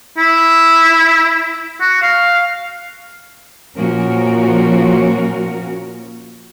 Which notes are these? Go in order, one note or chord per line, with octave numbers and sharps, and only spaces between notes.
E4
F#4
F5
A#2 F3 A#3 C#4 F#4 A#4